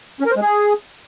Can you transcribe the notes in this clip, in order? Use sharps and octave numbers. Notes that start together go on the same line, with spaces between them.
C#4
A#4
C5
G#3
G#4